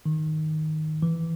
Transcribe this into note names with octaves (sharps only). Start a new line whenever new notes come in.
D#3
E3